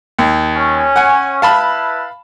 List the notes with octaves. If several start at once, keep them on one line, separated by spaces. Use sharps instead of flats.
D#2
C#4
F#5 G#5
E4 B4 F5 A5 B5